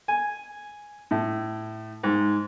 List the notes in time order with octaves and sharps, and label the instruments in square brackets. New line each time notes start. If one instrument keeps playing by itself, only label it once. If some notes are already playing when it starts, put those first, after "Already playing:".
[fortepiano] G#5
A2
G#2